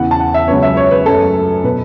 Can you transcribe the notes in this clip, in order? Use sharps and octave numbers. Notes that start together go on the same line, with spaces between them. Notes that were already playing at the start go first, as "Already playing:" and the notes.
Already playing: E2 C#3 E3 F#5
A5
F#5
E5
C#2 C#3 F#3 B3 C#5
E5
C#5
B4
F#2 F#3 A3 A4
B2 B3 B4